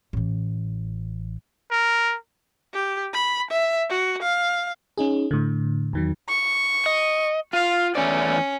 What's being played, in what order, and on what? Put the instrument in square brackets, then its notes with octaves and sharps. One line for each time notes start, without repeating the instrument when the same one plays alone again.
[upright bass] A1 E3
[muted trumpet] A#4
[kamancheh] G4
B5
E5
F#4
F5
[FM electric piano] C#4 D#4 G#4
A2 D3
E2 D#3 F#3
[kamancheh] C#6
[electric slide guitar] D#5
[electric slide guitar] F4 [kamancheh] F5
[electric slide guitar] E2 A3 D5 [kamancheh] C#4